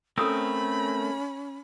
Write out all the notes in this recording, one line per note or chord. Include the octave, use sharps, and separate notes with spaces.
A3 C4 C#4 A4 A#4 B5 D#6 E6